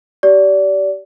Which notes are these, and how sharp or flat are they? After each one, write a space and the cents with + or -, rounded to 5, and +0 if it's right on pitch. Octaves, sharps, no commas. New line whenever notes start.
G4 -25 D5 -25